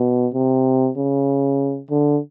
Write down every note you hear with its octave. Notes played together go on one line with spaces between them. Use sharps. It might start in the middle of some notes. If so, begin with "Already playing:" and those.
Already playing: B2
C3
C#3
D3